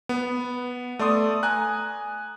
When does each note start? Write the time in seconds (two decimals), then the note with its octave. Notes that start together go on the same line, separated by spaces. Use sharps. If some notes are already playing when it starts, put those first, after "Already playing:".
0.09 B3
0.99 A3 D5 C6 D#6
1.43 G#5 A#5 F#6